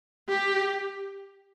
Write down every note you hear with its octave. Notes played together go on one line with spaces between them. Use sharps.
G4